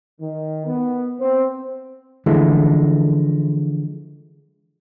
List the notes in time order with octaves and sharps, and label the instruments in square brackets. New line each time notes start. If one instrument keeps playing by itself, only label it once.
[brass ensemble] D#3
B3
C4
[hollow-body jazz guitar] D3 E3 F3 G#3 A3